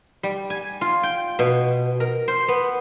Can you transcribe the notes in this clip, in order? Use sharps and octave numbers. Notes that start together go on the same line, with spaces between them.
G3
G#5
F4
G5
B2
A#4
C5
B3